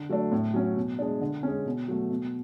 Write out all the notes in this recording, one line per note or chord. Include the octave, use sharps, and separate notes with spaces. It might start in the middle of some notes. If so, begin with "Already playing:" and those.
Already playing: D3
F#3 A3 D4
A2
F#3 C#4
B2
G#3 D4
D3
G#3 C#4
B2
F#3 A3
B2